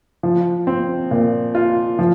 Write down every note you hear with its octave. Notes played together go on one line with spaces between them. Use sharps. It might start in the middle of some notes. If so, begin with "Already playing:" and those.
F3
C4
A#2
F4
F3